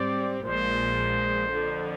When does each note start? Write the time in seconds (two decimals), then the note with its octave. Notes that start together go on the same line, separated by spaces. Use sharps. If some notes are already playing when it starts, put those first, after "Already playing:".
Already playing: G#2 G3 C4 G4 D5
0.44 A#1 A#2 F3 G#3 C5
1.52 F2 D3 F3